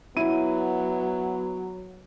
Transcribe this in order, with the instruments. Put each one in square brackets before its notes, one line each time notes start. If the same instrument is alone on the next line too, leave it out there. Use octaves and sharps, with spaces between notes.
[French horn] F#3 [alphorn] B3 [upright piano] E4 D#7